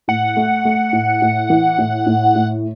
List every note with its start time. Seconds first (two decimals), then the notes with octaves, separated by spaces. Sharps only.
0.08 A2 F#5
0.37 A3
0.65 A3
0.93 A2
1.22 A2
1.50 E3
1.78 A2
2.07 A2
2.36 A2